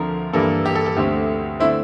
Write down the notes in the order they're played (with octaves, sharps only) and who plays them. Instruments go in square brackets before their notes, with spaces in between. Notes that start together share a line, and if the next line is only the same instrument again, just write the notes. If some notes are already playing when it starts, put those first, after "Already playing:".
Already playing: [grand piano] D2 D3 F3 C4 A#4
G2 E3 G3 A#3 D4 A4
G4
A4
A4
D2 D3 A3 C4 G4
D3 A3 C4 E4